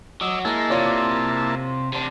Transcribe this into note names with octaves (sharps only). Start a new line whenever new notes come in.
F#3 D#5 D6 E6
G#3 A#3 E4 A5
C3 F4 C#5 D5
C3 D4